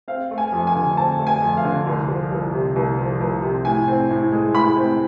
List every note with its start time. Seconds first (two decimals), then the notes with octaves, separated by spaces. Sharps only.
0.08 C4 F5
0.31 A3
0.38 G#5
0.52 F2
0.67 G#5
0.75 D3
0.97 C4 A5
1.19 A3
1.27 G#5
1.42 F2
1.57 F5
1.65 D3
1.87 C2
2.09 F3
2.32 C2
2.53 C3
2.76 C2
2.99 F3
3.21 C2
3.42 C3
3.65 A2 G#5
3.88 C4
4.11 A2
4.32 G#3
4.55 A2 B5
4.76 C4